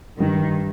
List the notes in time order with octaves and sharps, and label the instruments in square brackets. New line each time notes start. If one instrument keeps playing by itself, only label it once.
[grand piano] G2 [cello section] D#3